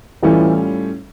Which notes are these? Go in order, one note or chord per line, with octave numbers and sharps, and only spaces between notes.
A2 E3 G3 C#4 E4 F4 A4